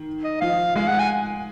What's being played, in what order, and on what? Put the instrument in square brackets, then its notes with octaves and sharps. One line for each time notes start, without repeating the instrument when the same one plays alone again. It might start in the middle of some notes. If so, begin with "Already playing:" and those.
Already playing: [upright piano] D#3
[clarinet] D#5
[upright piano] F3 [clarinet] F5
[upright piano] G#3 [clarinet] F5
[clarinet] F#5
G#5